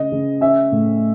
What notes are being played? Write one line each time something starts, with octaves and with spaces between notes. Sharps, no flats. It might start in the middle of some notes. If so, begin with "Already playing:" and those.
Already playing: C#3 D#5
C#3
C#4 E5
A2